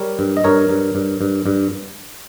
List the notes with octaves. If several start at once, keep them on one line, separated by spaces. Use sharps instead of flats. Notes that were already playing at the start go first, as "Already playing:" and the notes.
Already playing: G3 A#4 C#5
G2
D#5
G2 A#4 C#5
G2
G2
G2
G2